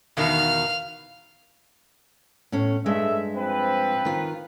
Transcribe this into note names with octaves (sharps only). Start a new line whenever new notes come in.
E2 B2 D#3 F5 F6
A2 C#4
G2 G#3 A3 E5
F3 C4 B4
D#3 F4